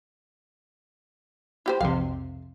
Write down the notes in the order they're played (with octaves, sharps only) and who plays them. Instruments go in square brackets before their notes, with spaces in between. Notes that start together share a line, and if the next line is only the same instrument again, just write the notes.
[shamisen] E4 G4 C5
[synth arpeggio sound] B1 F2 C3 [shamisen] F5